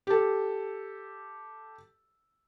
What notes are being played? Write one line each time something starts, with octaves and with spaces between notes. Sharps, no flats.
G4 A4